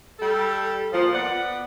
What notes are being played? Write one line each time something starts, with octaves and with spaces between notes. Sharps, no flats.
G3 A4
A#2 F3
B3 D5 F#5